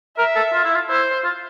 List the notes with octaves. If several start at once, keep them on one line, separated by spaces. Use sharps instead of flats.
A#4 E5
A4
F4
E4
F4
E4 C5
F4